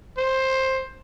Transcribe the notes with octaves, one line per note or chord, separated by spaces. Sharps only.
C5